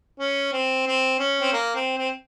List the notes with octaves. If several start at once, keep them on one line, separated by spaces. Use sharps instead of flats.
C#4
C4
C4
C#4
C4
A#3
C4
C4